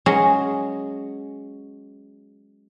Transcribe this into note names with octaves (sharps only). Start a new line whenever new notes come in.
F#3 G#3 C#4 G#4